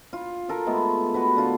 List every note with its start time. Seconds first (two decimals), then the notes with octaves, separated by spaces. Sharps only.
0.13 F4
0.48 F4 A4 A#4
0.66 G#3 A3 B3
1.14 F#4 B4
1.37 D3 B3 F4